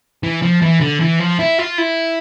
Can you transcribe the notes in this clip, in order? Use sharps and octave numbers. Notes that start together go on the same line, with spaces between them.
E3
F3
E3
D3
E3
F3
E4
F4
E4